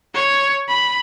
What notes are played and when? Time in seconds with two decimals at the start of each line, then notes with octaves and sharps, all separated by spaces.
0.15 C#5
0.69 B5